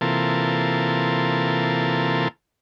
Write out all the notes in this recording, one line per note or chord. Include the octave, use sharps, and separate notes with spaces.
C3 E3 A#3 F4 A4